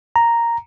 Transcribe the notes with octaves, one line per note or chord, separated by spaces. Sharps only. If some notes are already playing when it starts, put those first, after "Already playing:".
A#5